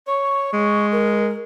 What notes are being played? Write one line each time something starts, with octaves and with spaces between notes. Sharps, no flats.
C#5 C#6
G#3
A#4